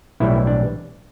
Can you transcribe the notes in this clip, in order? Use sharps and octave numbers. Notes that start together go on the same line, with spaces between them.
B1 A2 E3 G3 E4
D4